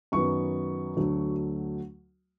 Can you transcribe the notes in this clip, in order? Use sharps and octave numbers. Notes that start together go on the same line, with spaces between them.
F#2 D#3 F#3 B3 C#6
D2 D3 F#3 A3